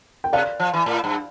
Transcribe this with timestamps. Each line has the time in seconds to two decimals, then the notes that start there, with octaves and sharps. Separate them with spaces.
0.24 G5
0.33 C3 D5 F5
0.60 F3
0.74 E3
0.86 A2
1.04 G2